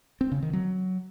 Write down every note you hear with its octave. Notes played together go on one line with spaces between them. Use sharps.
C4
C#3
D#3
F#3